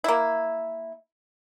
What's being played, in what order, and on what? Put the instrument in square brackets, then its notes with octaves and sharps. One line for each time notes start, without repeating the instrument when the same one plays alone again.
[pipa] A#3 E4